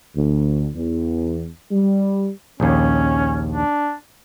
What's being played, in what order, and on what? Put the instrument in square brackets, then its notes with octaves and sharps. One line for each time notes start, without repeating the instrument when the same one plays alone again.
[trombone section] D2
E2
G3
[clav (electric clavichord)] A#1 D#2 [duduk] C#4
[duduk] D4